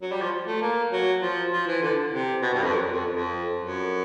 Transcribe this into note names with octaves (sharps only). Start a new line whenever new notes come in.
F#3
G3
F3
A3
A#3
F#3
F3
F3
E3
D3
C3
B2
G2
F2
F#2
F2
F2
F#2